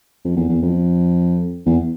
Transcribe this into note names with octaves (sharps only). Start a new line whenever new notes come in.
F2
E2
E2
F2
E2